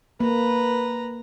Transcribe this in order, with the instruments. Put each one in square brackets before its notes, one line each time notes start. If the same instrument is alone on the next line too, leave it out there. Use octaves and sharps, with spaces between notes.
[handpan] A#3 [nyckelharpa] B4 A#5